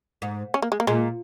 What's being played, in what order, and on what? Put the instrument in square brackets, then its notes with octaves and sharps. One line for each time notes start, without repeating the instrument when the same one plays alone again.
[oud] G#2
[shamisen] C#4
A#3
G#3
A#3
[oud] A#2 [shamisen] G#3